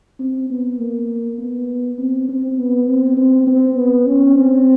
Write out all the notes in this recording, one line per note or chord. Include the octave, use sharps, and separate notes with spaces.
C4
B3
A#3
B3
C4
C4
B3
C4
C4
C4
B3
C#4
C4